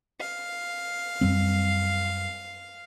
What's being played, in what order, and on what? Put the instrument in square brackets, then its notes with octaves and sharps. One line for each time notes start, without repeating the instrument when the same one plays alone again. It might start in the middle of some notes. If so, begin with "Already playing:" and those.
[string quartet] F5
[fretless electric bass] F#2 G3 C4